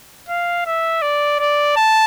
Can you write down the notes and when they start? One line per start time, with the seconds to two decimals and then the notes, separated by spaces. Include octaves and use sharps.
0.29 F5
0.66 E5
1.02 D5
1.40 D5
1.76 A5